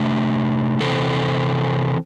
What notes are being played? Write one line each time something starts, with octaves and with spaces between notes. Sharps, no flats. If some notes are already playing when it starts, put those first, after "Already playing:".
Already playing: C3 A3 D4
C3 E3 C4 A4